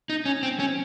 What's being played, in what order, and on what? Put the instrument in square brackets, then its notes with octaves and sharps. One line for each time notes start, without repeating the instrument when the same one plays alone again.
[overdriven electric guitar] D#4
C#4
C4
C#4